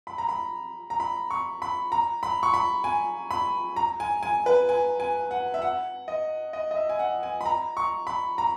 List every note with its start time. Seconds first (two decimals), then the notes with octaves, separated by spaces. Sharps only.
0.07 B5
0.18 A#5
0.29 B5
0.90 A#5
1.00 B5
1.31 C#6
1.62 B5
1.92 A#5
2.23 B5
2.43 C#6
2.54 B5
2.84 G#5
3.31 B5
3.76 A#5
4.00 G#5
4.23 G#5
4.46 B4
4.69 G#5
5.00 G#5
5.31 F#5
5.54 E5
5.62 F#5
6.08 D#5
6.53 D#5
6.71 D#5
6.76 E5
6.89 G#5
6.99 F#5
7.23 G#5
7.41 B5
7.46 A#5
7.77 C#6
8.07 B5
8.38 A#5